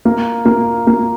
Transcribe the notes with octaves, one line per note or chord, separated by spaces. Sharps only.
A#3
A#3
A#3